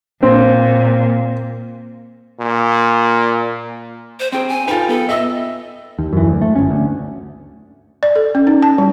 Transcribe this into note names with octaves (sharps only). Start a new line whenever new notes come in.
A#2 C4
A#2
C5
C4 G#4 G5
G#5
D#4 F4 A4 B4 G5
B3 A4
D#5 E5 E6
D#2
F#2 E3
D2
A3
G1 C#4
D2
D5
A4
C#4
D#4
A5
G3